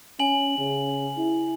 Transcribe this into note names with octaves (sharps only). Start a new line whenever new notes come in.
C#4 G#5 F#7
C#3
E4